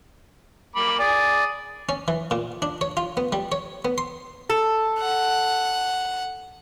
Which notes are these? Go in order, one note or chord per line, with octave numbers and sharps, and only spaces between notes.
A#3 B5 D6
D5 G#5 D#6
C#4
E3
A#2
D4
C#5
F4
B3
G3
C#5
B3
C6
A4
F#5